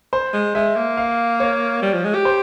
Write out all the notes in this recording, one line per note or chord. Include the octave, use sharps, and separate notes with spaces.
C5
G#3
G#3 E5
A#3
F5
C#5
G3
F3
G#3
G4
C5